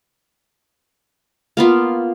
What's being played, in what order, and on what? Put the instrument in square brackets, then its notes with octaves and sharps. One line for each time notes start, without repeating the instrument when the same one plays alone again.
[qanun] A#3 B3 F4